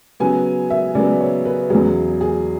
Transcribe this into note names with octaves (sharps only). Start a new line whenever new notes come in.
C#3 F#3 B3 G#5
E5
C#3 F#3 B3 D5
C#5
B4
E2 C#3 F#3 G#4
G#4